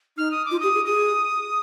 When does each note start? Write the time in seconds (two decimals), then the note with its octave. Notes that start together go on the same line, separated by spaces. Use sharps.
0.17 D#4 F6
0.31 D#6
0.45 D6
0.51 F4
0.60 G4 D#6
0.75 G#4
0.86 G#4 D#6